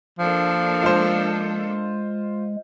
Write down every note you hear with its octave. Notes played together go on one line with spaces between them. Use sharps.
F3 A#3 D4 A4
G#3 F4 C5